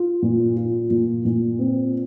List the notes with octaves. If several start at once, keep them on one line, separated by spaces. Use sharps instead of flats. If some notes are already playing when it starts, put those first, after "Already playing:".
Already playing: F4
A#2
F4
A#2
A#2
C4